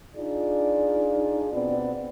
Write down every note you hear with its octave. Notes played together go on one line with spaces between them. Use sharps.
D4 D#4 F4 G#4 D5
B2 B3 C4 D5